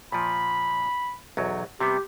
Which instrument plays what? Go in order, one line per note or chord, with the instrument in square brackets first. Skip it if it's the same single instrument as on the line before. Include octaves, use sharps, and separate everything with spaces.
[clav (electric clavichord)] A#2 F3 [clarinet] B5
[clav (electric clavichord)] B1 E2 F#3
[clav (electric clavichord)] C3 G3 B3 [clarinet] G4